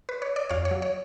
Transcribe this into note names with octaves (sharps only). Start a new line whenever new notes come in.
B4
C#5
D5
F2 C#5 F5
C#5
F#3
C#5